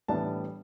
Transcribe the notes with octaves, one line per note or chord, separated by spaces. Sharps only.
A2 E3 G3 B3 D4 A5